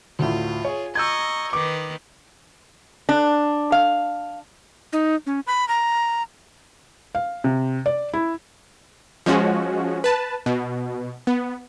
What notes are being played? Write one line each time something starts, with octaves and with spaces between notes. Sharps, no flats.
D2 A2 F4
G#4 C#5
D#5 A#5 C#6 E6 G6 G#6
D#3 B4 D6
D4
F5
D#4
C#4
B5
A#5
F5
C3
D5
E4
F3 G#3 C#4 F#4
B4 A5
B2
B3